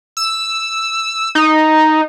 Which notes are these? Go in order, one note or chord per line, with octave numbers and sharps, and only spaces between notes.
E6
D#4